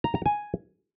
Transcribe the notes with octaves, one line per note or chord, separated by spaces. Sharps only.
A#5
A#5
G#5